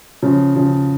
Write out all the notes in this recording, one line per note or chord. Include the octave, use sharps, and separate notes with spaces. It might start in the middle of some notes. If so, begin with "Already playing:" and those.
C#3 F3
C#3 F3